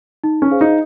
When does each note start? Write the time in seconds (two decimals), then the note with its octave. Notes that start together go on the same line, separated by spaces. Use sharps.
0.24 D#4
0.42 C#4
0.51 G#4 C5 F5
0.61 D#4